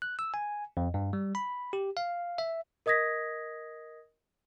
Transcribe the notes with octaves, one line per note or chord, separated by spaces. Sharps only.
F#6
E6
G#5
F2
G2
G3
B5
G4
F5
E5
A#4 D#5 D#6 G#6 A#6 B6